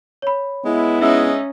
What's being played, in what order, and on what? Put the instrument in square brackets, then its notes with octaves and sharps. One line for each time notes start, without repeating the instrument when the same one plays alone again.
[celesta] C#5 B5
[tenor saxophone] G#3 [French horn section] B3 E4
[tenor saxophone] G#3 [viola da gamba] C#4 D#4 [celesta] E5 E6